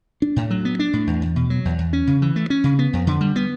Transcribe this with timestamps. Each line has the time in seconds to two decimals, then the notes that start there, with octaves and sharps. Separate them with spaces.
0.22 D4
0.36 A2
0.51 F#3
0.65 B3
0.79 D4
0.93 A2
1.07 E2
1.22 E2
1.36 B2
1.50 F#3
1.65 E2
1.79 E2
1.93 C#4
2.07 C#3
2.22 E3
2.36 A3
2.50 C#4
2.64 C#3
2.79 B3
2.93 F2
3.07 D3
3.21 G3
3.36 B3